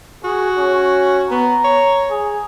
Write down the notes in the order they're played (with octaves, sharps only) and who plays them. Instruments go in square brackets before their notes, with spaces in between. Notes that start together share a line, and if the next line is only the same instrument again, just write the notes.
[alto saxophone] F#4 [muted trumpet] G#4
[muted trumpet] C#4
[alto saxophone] B3 [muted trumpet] A#5
[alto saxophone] C#5
[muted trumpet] G#4